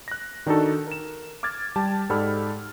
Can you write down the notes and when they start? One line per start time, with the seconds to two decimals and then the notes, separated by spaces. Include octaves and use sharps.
0.08 F#6 A#6
0.47 D#3 D4 D#4 F#4 A4
0.87 A#4 E7
1.43 D6 F6 G#6 A6
1.76 G3 G4 A5
2.09 G#2 G4 A4 D5 B5 F6